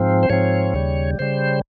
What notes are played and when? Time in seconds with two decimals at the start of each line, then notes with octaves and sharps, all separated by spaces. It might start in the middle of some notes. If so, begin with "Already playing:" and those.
Already playing: G#2 F3 C4
0.23 C5
0.30 G#2 F3 C4 C#5
0.74 D#2 C#3 G3
1.19 C#3 G3 C5